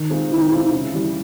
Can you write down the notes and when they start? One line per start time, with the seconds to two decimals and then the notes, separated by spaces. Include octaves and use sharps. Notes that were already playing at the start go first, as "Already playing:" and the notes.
Already playing: D#3
0.10 G#3 C4 F4
0.31 D#3 E4
0.41 D#4
0.51 G#3 C4 E4 F4
0.72 C#3
0.94 E3 G3